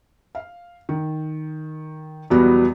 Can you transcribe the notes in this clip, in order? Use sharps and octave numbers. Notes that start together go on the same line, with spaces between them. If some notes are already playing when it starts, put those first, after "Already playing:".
F5
D#3
E2 B2 F#3 G3 B3